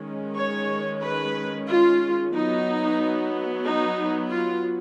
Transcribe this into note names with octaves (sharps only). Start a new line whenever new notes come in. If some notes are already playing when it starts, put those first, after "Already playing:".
Already playing: D#3 G#3 C#4
C#5
B4
F4
F#3 B3 D#4
D#4
F4